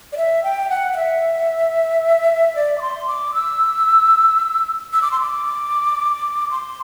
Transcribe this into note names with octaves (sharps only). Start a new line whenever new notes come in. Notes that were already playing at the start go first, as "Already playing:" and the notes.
D5
E5
G5
F#5
F#5
E5
D5
D6
C6
D6
E6
E6
D6
C6
D6
C6